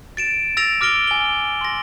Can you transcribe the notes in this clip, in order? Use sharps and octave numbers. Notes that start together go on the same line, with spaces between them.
A6 D7 E7
E6 A6 A#6 D7 F7
D6 F6 A#6 D7 G7
G#5 G7
C6 A#6